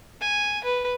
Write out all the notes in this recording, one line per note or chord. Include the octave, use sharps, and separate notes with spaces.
G#5
B4